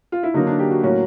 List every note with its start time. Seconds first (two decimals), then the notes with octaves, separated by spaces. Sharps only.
0.12 F4
0.23 E4
0.34 D3 F#3 A#3 D#4
0.47 D4
0.59 G4
0.71 F#4
0.83 A2 F#3 A#3 C#4 F#4